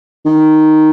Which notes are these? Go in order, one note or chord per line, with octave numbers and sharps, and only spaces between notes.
D#3